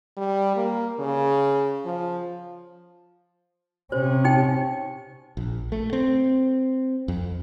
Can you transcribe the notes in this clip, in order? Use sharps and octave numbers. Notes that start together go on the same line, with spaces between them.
G3
A#3
C#3
F3
C3 C#4 C5
D#4 G5
A#1
A3
C4
F2